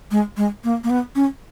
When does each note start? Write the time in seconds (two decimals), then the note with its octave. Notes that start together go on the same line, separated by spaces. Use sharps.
0.11 G#3
0.37 G#3
0.64 A#3
0.84 A#3
0.90 B3
1.15 C#4